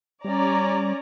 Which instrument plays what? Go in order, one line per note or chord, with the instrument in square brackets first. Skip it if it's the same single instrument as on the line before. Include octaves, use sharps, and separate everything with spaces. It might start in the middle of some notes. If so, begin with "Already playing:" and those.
[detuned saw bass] G3 [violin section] C#4 D5 A#5